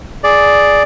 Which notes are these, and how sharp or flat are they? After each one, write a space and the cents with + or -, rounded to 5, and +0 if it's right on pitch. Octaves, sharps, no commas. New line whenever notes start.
G#4 +5 D5 +0